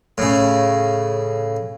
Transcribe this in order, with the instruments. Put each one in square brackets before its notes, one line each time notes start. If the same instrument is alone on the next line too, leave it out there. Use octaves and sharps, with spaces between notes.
[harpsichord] A2 C#3